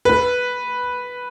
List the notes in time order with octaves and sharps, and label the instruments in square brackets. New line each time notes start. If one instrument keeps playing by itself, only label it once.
[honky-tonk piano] B4